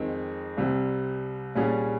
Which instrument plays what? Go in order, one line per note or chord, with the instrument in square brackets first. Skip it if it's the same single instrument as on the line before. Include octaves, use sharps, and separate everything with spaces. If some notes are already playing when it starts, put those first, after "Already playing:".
Already playing: [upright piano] F2 D#3 G#3 C4
C2 C3 G3 C4
C2 A#2 G3 C#4 G#4